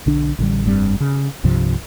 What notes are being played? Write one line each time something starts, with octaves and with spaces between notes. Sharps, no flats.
B1 D3 D4
A1 D3 D#3 G3
F1 G2 G3 C4
C#3
C2 G2 C3 F3